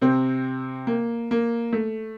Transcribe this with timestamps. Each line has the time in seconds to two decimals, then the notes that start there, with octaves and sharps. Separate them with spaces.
0.01 C3 C4
0.87 A#3
1.31 A#3
1.73 A3